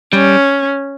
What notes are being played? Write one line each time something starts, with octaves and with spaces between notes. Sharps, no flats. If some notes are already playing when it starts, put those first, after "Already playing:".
G3 C#4